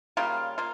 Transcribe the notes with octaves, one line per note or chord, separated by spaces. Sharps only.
C#3 G3 A#3 F4
A#3 F4